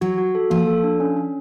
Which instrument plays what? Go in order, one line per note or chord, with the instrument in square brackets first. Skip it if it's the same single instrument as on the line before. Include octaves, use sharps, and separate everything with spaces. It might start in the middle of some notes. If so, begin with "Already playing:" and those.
[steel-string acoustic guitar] F#3 [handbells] F#4
[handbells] F#4
A4
[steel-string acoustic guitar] F3 [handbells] A#3
[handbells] A4
D4
C#4
C#4